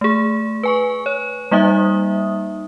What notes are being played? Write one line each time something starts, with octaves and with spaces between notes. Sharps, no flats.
A3 G#4
B4 G#5 C#6
C#5
G3 A#3 D#4 E5 D#6